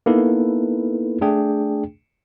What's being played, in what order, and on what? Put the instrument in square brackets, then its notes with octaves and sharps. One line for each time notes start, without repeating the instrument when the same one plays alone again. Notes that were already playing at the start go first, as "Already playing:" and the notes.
[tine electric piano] A#3 B3 D#4 E4 A4 B4
A3 D4 G#4 G5